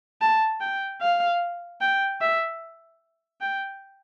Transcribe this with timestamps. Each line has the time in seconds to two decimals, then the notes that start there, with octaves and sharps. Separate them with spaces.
0.21 A5
0.60 G5
1.01 F5
1.81 G5
2.21 E5
3.41 G5